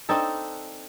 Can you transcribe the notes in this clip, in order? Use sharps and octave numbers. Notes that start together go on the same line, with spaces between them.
C4 D4 D#4 A4